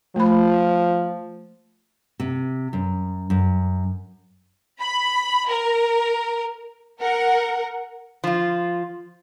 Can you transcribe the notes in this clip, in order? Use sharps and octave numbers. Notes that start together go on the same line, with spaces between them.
F3 A3 B5
C3
F#2
F#2
B5
A#4
A#4 F#5
F3 F4